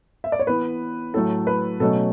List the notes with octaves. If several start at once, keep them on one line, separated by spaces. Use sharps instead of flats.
E5
D5
C#5
E3 B3 B4
A2 F#3 A3 A4
B4
B2 F#3 A3 C#4 A4